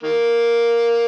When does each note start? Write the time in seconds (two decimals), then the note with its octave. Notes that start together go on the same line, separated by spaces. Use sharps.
0.03 D#3 A#3